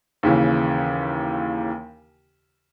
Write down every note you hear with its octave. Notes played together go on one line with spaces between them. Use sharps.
D#2 C#3 E3